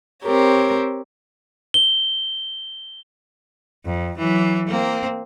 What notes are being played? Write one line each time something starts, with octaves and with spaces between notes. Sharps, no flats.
C4 G4 A#4 C#5
G7
F2
E3 F#3
A#3 C4